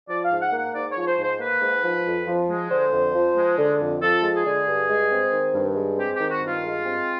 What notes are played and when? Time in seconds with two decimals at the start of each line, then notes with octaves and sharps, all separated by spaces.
0.09 F3 D5
0.25 F5
0.31 G#2
0.42 F#5
0.52 A#3
0.58 F#5
0.74 G#2 D5
0.91 C#5
0.97 F3
1.07 C5
1.18 G#2
1.23 C5
1.40 A#3 B4
1.61 G#2
1.84 F3
2.06 F2
2.27 F3
2.49 G#3
2.70 D3 C5
2.93 F2
3.15 F3
3.37 G#3
3.58 D3
3.81 F2
4.02 F3 A4
4.23 G#3
4.35 G#4
4.45 D3
4.67 G2
4.90 G#3
5.11 C4
5.32 D#3
5.54 G2
5.76 G#3
5.98 C4 G4
6.15 G4
6.20 D#3
6.30 F#4
6.41 G2
6.47 F4
6.64 G#3
6.85 C4